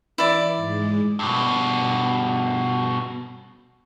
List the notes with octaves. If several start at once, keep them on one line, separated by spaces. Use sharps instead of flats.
E3 E4 D5
G#2 G#3
G2 B2